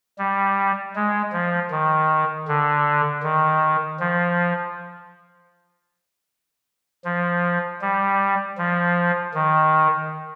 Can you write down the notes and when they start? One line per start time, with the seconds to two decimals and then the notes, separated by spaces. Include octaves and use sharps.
0.18 G3
0.96 G#3
1.33 F3
1.71 D#3
2.48 D3
3.23 D#3
4.00 F3
7.05 F3
7.81 G3
8.58 F3
9.34 D#3